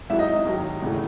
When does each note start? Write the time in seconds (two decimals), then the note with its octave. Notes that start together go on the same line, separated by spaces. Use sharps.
0.10 G#1 G#2 F#3 E4 E5
0.19 D#4 D#5
0.46 D#2 D#3 F#3
0.82 G#1 C#3 E3 A3